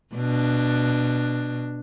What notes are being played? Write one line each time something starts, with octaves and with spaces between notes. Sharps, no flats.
B2 D4